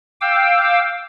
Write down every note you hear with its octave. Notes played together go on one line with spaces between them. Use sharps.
F5 G5 D6 E6